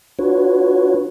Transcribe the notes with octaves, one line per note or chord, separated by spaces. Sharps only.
D4 F4 F#4 B4 C#5